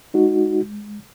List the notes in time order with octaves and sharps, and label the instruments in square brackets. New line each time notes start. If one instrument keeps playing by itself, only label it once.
[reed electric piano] G#3 D#4 F#4